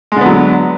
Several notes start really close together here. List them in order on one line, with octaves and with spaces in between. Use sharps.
G#3 D3 B3 F#3